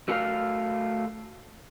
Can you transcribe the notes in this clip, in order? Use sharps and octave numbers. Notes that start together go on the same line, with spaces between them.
A3 F#4 A4 A#4 F5